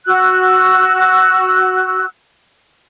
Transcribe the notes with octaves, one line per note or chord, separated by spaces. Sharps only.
F#4 E6 F#6